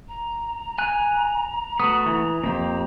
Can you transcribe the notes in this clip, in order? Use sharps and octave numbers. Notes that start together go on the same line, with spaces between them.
A#5
G#5 F#6
A3 B3 F#4 D#6
E3
F2 A#3 G4